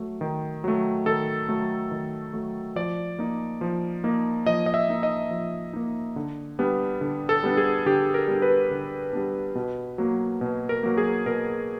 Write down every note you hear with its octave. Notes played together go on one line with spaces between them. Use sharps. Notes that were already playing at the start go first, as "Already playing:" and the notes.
Already playing: F#3 A3
D#3
F#3 A3
D#3 A4
F#3 A3
D#3
F#3 A3
F3 D5
A#3 D#4
F3
A#3 D#4
F3 D#5
D#5
E5
A#3 D#4
D#5
F3
A#3 D#4
D3
G3 B3 D4
D3
A4
G3 B3 D4
G#4
D3 G4
A#4
G3 B3 D4
B4
D3
G3 B3 D4
B2
F#3 A#3
B2
A#4
F#3 A#3
G#4
B2 A#4